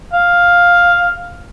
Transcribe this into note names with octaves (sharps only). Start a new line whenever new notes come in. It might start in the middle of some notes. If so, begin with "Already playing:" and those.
F5